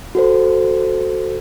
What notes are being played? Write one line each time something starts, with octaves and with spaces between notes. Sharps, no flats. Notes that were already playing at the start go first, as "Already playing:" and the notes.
F#4 A4 C5